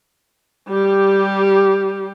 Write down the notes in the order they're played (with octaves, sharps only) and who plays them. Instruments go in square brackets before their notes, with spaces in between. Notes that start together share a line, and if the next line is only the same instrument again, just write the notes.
[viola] G3 G4